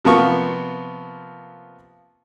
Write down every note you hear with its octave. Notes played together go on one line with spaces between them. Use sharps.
C3 F3 A#3 B3 F4 C#6